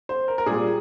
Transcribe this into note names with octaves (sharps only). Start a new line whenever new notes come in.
C5
A#4
A#4
A#2 G3 G#4